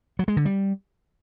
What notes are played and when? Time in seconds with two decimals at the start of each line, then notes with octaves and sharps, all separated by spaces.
0.19 F#3
0.28 G#3
0.37 D3
0.45 G3